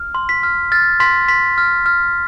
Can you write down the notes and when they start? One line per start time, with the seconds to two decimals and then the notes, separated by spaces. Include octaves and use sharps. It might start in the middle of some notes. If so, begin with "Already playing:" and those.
Already playing: F6
0.15 C6
0.29 B6
0.43 F6
0.72 F6 A6
1.00 C6 B6
1.28 C6 B6
1.58 F6
1.86 F6